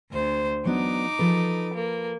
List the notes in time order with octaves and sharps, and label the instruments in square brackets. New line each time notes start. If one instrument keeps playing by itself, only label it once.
[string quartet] D2 C5
[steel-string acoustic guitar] F#3 B3 D4 [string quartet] D#4 D6
[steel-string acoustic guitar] F3 A4 B4
[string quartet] A#3